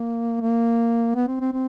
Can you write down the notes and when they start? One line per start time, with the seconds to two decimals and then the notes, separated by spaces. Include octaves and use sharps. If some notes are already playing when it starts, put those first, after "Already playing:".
Already playing: A#3
0.41 A#3
1.15 B3
1.27 C4
1.40 C4
1.53 C4